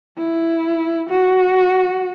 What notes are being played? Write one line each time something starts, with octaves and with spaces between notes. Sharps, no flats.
E4
F#4